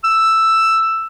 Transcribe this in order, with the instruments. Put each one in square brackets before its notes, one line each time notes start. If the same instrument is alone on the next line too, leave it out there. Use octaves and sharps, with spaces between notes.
[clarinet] E6